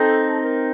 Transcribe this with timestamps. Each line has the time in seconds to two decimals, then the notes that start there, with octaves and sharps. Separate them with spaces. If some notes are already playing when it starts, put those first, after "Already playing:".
Already playing: C4 D#4 A4
0.44 A#4